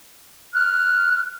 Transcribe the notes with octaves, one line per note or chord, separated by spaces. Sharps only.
F6 F#6